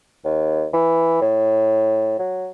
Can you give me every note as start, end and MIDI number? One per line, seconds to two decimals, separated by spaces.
0.25 0.66 39
0.73 1.21 52
1.22 2.17 45
2.19 2.51 54